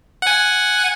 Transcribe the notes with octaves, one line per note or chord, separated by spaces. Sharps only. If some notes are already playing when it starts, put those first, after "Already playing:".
F#5 G#5